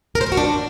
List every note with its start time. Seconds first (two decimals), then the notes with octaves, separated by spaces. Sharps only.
0.15 A#4
0.21 C5
0.26 A#4
0.32 F#4
0.37 D4